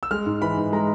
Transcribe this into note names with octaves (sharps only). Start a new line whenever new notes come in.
E6
G#3 F6
G#2
E3 B5
G#2
G#3 A#5